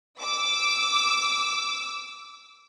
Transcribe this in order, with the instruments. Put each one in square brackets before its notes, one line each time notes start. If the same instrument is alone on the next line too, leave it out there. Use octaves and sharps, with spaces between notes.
[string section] D6 E6